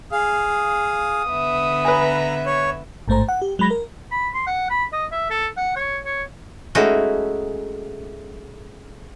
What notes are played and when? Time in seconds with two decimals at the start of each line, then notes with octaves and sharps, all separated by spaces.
0.12 G#4 F5 D#6
1.29 D3 B3 E5
1.85 B4 G#5 A#5
2.46 C#5
3.08 A1 G#2 A3 C5 A#5
3.29 F#5
3.42 G4
3.59 F#3 G#3 B5 A#6
3.70 A#4
4.12 B5
4.34 C6
4.47 F#5
4.70 B5
4.92 D#5
5.12 E5
5.30 A4
5.57 F#5
5.76 C#5
6.05 C#5
6.75 G#3 A3 C#4 D#4 E4 F#4